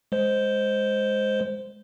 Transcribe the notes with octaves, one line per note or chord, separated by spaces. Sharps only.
G#3 C5